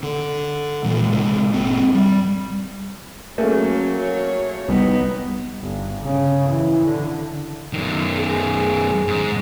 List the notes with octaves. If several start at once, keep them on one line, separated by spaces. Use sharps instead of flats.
D3
A#2 E3 G#3
A1 C3 G#3
G1 A#2 C4
G3
F#3 A3 A#3 C#4 G#4
C#5
C2 G3 B3 D#4
G1
C#3
E3
D3
F#2 D#3
G#4
G#2